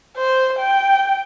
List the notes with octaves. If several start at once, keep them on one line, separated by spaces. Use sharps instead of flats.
C5
G5